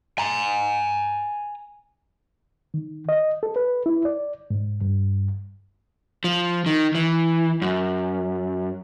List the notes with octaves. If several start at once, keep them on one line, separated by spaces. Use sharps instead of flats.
G#5 A#5
D#3
D#5
A4
B4
E4
D5
G#2
G2
F3
D#3
E3
F#2